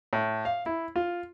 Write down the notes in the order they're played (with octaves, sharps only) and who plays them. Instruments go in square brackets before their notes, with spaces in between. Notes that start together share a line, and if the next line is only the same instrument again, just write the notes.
[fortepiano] A2
F5
E4
F4